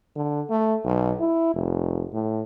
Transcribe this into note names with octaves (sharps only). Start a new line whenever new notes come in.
D3
A3
B1
E4
F1
A2